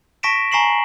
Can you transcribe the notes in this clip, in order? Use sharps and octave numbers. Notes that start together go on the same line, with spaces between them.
A5 C#6 A#6 B6 D7 E7
G#5 A#5 C#6 C7 E7 F#7